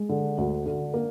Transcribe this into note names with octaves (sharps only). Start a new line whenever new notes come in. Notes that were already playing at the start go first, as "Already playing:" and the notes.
Already playing: G#3
D3
D2
D3
A#3